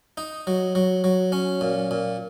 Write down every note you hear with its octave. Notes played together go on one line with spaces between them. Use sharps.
D#4
F#3
F#3
F#3
C#4
A#2
A#2